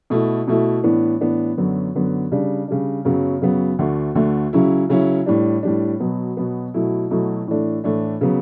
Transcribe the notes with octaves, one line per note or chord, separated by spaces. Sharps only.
B2 A3 E4
B2 A3 E4
A2 E3 B3 D4
A2 E3 B3 D4
F#2 D3 F#3 B3
F#2 D3 F#3 B3
C#3 G3 D4
C#3 G3 D4
F#2 C#3 F#3 B3
F#2 C#3 F#3 B3
D2 D3 A3
D2 D3 A3
C#3 F#3 C#4 E4
C#3 F#3 C#4 E4
A2 G3 D4
A2 G3 D4
B2 F#3 B3
B2 F#3 B3
B2 F#3 A3 E4
B2 F#3 A3 E4
A2 E3 A3 D4
A2 E3 A3 D4
C#3 F#3 B3